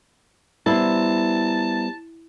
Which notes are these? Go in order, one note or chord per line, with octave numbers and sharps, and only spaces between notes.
G3 B3 E4 C5 A5